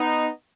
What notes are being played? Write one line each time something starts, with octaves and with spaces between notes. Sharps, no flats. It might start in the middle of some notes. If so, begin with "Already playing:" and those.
Already playing: B3 D#4